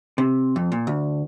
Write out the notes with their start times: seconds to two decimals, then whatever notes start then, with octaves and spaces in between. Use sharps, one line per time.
0.18 C3
0.56 F2
0.72 A#2
0.87 D2